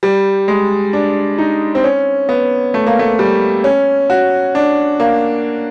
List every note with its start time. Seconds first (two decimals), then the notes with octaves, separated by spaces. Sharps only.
0.03 G3
0.48 G#3
0.93 D4
1.38 D#4
1.75 C4
1.84 C#4
2.29 B3
2.74 A3
2.87 A#3
2.99 A3
3.19 G3
3.64 C#4
4.10 F#4
4.55 D4
5.00 A#3